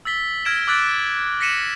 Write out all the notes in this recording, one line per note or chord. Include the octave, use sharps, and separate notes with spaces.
E6 A6 B6 G7
E6 F6 G#6 A#6 D7 E7
D6 E6 F#6 A6 B6 D7
D7
A#6 B6 C#7 D#7 E7 F#7